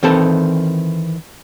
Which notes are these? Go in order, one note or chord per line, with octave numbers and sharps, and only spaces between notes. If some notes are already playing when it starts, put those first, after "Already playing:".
D#3 E3 C4 A4 A5